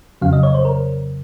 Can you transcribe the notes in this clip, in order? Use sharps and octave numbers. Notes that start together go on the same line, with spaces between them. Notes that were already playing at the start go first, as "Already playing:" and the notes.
F2 C#3 F#3 F5
D#5
C#5
C5
A#4